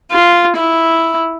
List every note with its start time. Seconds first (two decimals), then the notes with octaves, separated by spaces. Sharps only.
0.11 F4
0.56 E4